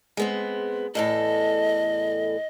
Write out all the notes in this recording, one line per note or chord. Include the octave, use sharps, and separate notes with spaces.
G#3 B3 C4
E2 A2 A4 D#5